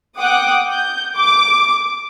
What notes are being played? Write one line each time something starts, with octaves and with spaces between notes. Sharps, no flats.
F#5 G5 D6 D#6 F#6
G6
D6